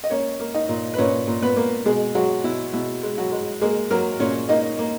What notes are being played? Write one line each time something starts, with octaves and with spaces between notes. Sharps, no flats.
D#5
A#3 C#4 C#5
A#3
D#4 D#5
A#2
B4
A#2 C#4 C#5
A#2
B3 B4
A#3
B2 G#3 G#4
F#3 G#3 F#4
B2 E4
B2 E4
G#3
F#3 F#4
G#3
G#3 A#3 G#4
F#3 A#3 A#4
A#2 C#4 C#5
A#3 D#4 D#5
A#3